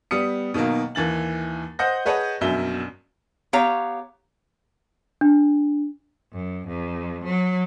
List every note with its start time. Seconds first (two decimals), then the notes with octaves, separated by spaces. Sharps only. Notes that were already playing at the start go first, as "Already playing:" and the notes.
0.11 G3 B3 D#6 C#7
0.54 B2 D#3 F#3 A#3
0.95 D#2 E3 A6 F#7
1.79 C5 D#5 F#5 D#6 G6 A#6
2.05 G#4 B4 C#5 D#5 F#5 A5
2.41 A#1 F#2 B2 F#3 E5 G7
3.53 B3 G4 C#5 F5 A#5
5.21 D4
6.32 F#2
6.67 F2
7.25 F#3